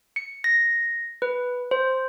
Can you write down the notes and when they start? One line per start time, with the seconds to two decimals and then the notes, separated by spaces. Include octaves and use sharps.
0.16 C#7
0.44 A#6
1.22 B4
1.71 C5